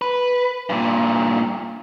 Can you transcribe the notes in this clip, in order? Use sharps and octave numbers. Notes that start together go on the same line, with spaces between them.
B4
G2 A#2